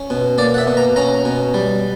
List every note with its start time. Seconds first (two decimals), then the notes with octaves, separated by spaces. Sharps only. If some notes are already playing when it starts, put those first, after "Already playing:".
Already playing: C#4
0.10 B2
0.38 A#3 D5
0.54 F#5
0.58 E5
0.67 B2
0.77 A#5
0.96 C#4 A#5
1.25 B2
1.54 G3